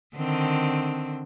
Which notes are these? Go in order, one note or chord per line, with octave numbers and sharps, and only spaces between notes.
D3 D#3 C4